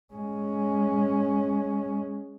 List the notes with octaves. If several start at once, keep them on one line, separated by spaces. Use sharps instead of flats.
G#3 C#4